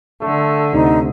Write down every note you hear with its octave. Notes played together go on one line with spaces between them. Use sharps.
D3 A3 A4
D2 C3 D#4